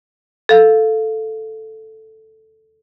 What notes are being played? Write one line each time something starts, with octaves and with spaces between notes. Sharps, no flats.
A4 F5